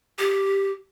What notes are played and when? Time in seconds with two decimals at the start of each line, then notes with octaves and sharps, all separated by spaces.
0.18 G4